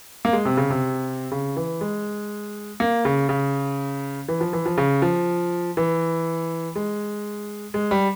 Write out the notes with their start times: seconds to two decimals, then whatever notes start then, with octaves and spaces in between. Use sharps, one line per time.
0.25 A#3
0.33 G#3
0.45 C3
0.57 C#3
0.70 C3
1.31 C#3
1.56 E3
1.81 G#3
2.80 A#3
3.05 C#3
3.29 C#3
4.28 E3
4.41 F3
4.53 E3
4.66 F3
4.77 C#3
5.02 F3
5.77 E3
6.76 G#3
7.74 G#3
7.91 G3